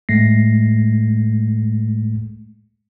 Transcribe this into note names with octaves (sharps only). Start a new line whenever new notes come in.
A2 G#3 A3 A#6 C7